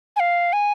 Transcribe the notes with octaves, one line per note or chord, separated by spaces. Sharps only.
G#5
F5
G#5